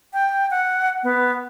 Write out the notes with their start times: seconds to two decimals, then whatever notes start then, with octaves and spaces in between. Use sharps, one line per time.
0.14 G5
0.51 F#5
1.03 B3